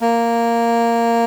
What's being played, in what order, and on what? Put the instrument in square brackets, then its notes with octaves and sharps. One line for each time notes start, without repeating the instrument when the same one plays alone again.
[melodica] A#3